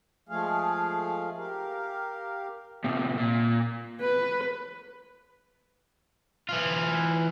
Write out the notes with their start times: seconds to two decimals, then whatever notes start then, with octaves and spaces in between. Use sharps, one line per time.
0.29 F3 G#3 A3 G#4 F5
1.37 G4 A#4 F5
2.84 A2 C3
3.18 A#2
4.01 B4
6.49 E3 F4